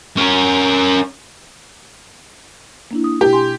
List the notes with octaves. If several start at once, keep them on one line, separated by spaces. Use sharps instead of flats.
C#4 A#4
A#3 D4 E4
D#6
B2 E4 G4
G#5 C6